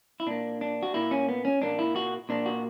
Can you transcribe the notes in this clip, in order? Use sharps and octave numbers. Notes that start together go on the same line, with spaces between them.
E4
A#2 A#3 D4
D4
F#4
A#2 A#3 E4
C#4
B3
C#4
A#2 A#3 D4
E4
F#4
A#2 A#3 D4
F#4